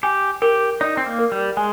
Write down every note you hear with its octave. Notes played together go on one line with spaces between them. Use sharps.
G4 G#5
G4 A#4
D#4 D5
C4
A#3
A#4
G3
G#3 G#5